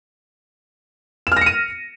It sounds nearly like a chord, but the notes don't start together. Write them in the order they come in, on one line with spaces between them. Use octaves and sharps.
E7 F6 A#6 C#7 D#7